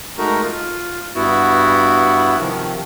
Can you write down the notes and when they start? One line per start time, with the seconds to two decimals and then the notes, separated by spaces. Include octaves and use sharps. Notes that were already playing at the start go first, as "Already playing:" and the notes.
0.18 G#3 A3 D#4 F#4 A#4
0.44 F4
1.15 G2 B3 E4 F#4
2.39 C3 D#3 F3